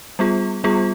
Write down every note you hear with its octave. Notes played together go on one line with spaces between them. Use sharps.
G3 B3 F4 G#4
G3 B3 F4 G#4